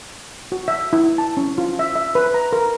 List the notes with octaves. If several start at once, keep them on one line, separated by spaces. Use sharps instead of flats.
F#4
E5
E4
A5
C#4
F4
E5
E5
B4
A#5
A#4